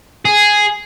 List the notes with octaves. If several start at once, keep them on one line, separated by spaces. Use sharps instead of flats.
G#4